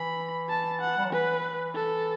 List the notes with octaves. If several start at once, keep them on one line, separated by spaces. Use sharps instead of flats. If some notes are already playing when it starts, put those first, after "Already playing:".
Already playing: E3 B5
A5
F#5
G3
F#3
E3 B4
A4